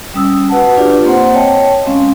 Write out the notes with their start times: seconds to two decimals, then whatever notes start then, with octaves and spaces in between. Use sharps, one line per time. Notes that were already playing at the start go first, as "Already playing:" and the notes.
0.14 G3 C#4 D#6 E6
0.49 F#4 B4 F#5 A5
0.77 D4 F4 G4 B4 D5
1.05 A#3 C4 C5 F#5
1.34 C#5 D#5 G5 A5
1.86 G#3 C4 C#4 F5